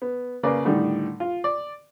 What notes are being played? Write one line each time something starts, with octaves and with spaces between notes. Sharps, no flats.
B3
C#3 A#3 B4 D5
A2 D3 D#3 G3
F4
D5